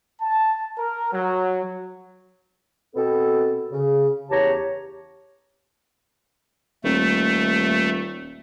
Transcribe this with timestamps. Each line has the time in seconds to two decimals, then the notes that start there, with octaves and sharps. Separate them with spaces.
0.21 A5
0.78 A#4
1.13 F#3
2.96 B2 B3 C4 A4
3.71 C#3
4.31 E2 C#4 G4 C#5 A5 A#5
6.84 D#1 A3